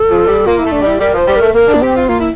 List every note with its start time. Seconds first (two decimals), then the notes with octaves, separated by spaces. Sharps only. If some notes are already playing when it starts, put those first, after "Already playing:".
Already playing: A4
0.10 F3
0.28 G3
0.45 A#3 F4
0.59 E4
0.64 A3
0.72 D4
0.81 G3
0.87 E4
1.00 G3 A#4
1.14 F3 C5
1.27 G3
1.36 A3 A#4
1.54 A#3 A#4
1.67 D4
1.75 A#3
1.82 C4 G4
1.95 F4
2.08 A#3 F4
2.19 E4